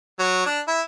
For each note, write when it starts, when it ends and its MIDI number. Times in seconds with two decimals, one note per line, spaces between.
0.19 0.45 54
0.46 0.60 62
0.68 0.81 64